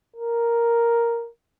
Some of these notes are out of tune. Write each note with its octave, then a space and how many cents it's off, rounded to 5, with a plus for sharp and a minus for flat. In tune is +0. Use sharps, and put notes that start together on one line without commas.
A#4 +0